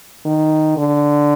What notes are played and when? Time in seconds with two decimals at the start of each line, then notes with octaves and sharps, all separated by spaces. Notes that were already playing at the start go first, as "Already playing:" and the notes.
0.25 D#3
0.77 D3